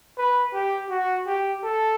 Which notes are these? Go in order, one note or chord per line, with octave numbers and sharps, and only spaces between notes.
B4
G4
F#4
G4
A4